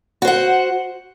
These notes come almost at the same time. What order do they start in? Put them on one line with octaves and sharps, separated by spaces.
F#4 C5 F#5